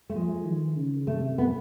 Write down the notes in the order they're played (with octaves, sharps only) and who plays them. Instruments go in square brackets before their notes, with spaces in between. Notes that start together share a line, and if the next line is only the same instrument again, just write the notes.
[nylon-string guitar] A3
[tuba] F3 [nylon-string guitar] G#3
[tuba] D#3
C#3
[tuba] C3 [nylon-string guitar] A3
[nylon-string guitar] B3